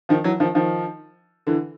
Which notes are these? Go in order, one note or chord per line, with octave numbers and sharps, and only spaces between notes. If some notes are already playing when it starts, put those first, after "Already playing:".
D#3 F3
E3 F#3
D#3 F3
D#3 F3
D3 E3